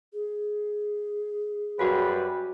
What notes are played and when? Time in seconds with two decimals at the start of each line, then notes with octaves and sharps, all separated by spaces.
0.13 G#4
1.79 F#2 G3 F#4 B4 F5